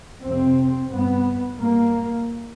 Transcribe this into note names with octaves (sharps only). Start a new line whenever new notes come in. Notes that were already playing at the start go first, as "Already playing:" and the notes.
F2 C3 C4
G2 B3
G2 A#3